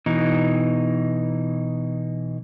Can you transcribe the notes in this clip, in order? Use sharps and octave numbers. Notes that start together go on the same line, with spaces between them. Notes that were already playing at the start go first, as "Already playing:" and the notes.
B2 E3 D#4